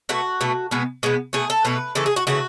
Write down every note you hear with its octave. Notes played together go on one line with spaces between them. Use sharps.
B2 A3 F#4
B2 A3
B2 G#3 B3
B2 G#3 B3
B2 A3 G#4
A4
B2 A3 B4
C#3 E3 A3 A4
G#4
F#4
C#3 E3 A3 F#4